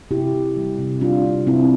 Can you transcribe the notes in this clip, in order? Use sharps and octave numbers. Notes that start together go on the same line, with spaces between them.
C3 E4 G4
C3
G3
C3
G3 D4 F4
C3
C3 C4 E4